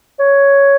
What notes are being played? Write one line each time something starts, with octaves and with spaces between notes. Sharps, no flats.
C#5